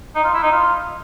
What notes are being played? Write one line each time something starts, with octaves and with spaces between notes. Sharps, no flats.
D#4
F4
E4
D#4
F4